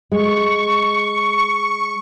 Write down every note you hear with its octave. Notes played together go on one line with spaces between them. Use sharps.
G#3 C#6